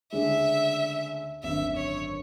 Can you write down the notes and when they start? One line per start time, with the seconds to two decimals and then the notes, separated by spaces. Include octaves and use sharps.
0.12 D2 C#3 G#3 D4 E5
1.43 G#1 F#2 D3 E5
1.76 C#5